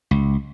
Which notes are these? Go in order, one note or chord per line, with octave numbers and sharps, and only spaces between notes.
C#2